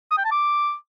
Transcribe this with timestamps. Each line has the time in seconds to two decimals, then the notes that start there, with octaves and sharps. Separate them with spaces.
0.11 D#6
0.18 G5
0.24 A5
0.31 D6